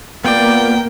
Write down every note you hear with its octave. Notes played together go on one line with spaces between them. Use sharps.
A#3 B3 F4 D5 G5